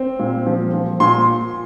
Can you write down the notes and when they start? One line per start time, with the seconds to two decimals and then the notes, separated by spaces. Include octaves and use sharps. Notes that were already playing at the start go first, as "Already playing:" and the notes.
Already playing: C4
0.19 A#2
0.47 F3
0.74 F3
1.00 A#2 C6